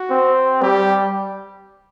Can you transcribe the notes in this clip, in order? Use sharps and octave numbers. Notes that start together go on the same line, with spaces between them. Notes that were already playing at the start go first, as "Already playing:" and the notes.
Already playing: F#4
C4
G3 G4